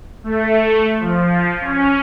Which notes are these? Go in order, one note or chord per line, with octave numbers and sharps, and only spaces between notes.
A3
F3
C#4